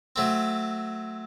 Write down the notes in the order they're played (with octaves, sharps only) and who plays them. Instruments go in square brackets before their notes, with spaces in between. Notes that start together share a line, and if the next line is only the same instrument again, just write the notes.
[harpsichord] F#3 A3 C4